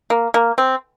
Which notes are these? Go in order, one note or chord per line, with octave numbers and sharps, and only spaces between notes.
A#3
A#3
C4